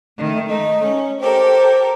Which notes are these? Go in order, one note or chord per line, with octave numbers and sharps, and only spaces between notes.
D#3 A3
A3 D#4 D#5
C#4
G4 A4 A#4 C5